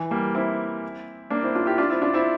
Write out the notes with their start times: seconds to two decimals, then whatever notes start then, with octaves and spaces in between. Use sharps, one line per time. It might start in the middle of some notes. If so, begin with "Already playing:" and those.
Already playing: E3
0.11 G3 A#3
0.35 C4 E4
1.30 A#3 D4
1.42 C4 E4
1.55 D4 F4
1.66 E4 G4
1.78 D4 F4
1.90 C4 E4
2.02 D4 F4
2.14 C4 E4